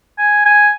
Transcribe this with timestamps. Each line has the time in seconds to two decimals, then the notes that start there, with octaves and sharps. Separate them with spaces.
0.18 G#5
0.45 G#5